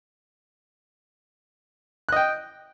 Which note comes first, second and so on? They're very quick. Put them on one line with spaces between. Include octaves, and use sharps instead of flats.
F#6 D#5 G5